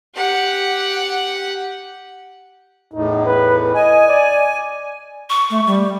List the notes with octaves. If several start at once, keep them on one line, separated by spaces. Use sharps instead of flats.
G4 F#5
E2 A2 D#4
B4
D#5 G#5
D5
C#6
A3
G3